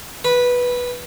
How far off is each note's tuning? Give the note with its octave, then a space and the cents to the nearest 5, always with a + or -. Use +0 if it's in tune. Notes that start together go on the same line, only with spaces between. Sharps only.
B4 -10